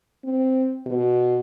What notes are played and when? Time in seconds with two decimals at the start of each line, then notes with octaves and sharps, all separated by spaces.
0.25 C4
0.87 B2